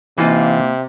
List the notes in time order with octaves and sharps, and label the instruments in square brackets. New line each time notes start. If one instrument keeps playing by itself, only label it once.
[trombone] C3 [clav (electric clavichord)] E3 D#4 F4 [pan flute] A#3